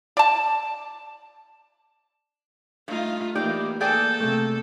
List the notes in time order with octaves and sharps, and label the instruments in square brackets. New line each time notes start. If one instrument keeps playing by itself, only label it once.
[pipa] D5 A5
[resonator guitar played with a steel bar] G2 [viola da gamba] A3 D#4 F4
[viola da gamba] E3 A#3 [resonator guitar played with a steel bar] D#4 G4 D5
[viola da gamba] A#3 A4 [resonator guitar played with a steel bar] G#4 D5 G5 [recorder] G6
[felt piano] C3 A3